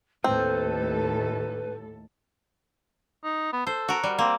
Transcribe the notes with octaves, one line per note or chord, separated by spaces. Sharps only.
D#2 A2 C4 A4 B4
D#4
B3
A4 C5
F#4 A#4
G3
A#3 C4